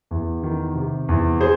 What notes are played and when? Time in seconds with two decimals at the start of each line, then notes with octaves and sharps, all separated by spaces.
0.11 E2
0.43 D#3
0.75 C3
1.09 E2
1.41 G#4 C5